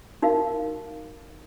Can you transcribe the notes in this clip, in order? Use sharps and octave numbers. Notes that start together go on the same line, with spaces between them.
D#4 F#4 A#4 F5